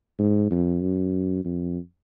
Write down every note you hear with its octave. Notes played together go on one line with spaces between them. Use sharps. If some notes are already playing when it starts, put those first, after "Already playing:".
G#2
F2
F#2
F2